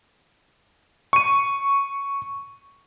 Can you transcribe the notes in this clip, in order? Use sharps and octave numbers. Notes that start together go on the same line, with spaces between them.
C#6 D#7